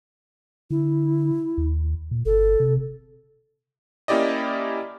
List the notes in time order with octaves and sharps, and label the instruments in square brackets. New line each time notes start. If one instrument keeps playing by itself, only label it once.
[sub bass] D3 [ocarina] E4
[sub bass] D#2
A#2
[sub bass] G1 [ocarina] A4
[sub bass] C3
[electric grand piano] A#3 C#4 E4 G4 D5 D#5